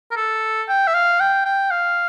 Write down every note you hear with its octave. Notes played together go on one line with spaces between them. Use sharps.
A#4
A4
G5
E5
F5
G5
G5
F5